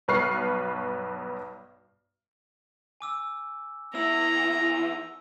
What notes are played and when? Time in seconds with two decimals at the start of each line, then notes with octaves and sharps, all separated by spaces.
0.08 B1 G2 B4 C#6 F6 C7
3.01 G#5 D6 E6
3.95 E2 E4 A#5 E6